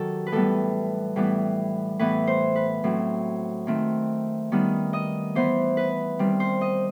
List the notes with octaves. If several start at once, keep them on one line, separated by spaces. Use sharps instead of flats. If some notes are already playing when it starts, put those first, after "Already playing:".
Already playing: D#3 F#3 G4 A4
B4
A2 E3 G3 B3 A4
A2 E3 G3 B3
A2 E3 B3 B4
C5
B4
A2 F#3 C4
D#3 A3 C4
D#3 G3 B3
D#5
E3 B3 C5
B4
D#3 G3 C4
C5
D#5